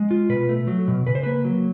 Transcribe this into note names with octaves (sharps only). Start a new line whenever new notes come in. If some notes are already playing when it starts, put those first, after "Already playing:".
Already playing: G#3
F4
B2 B4
A3
F#3
B2
C#3 B4
C5
A#3 B4
F#3